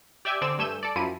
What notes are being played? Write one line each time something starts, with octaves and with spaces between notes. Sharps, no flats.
G4 D5 E5 G5 G#5
D3 C4 D5 G#5 E6
G2 A3 G#5 E6 G6 E7
A4 D5
F#2 F3 E4 D#7